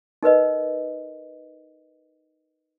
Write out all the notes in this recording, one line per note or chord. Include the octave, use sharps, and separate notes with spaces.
D#4 A#4 B4 D#5